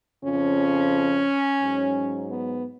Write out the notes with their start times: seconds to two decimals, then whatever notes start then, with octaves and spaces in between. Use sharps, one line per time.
0.24 F2 C#3 F3 C#4
1.61 G#2 F#3
2.29 B3